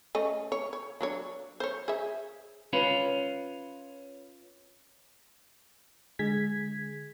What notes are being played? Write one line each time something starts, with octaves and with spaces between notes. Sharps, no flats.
A3 C#4 D#5
C#5
C#5
F#3 D4 C#5
C5 C#5
G#4 E5
C#4 F4 B4
D3 G#3 G#4 G#6 B6